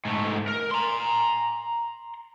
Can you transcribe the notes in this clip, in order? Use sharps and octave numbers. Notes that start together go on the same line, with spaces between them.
G#2 A3
A#4
A#5 C6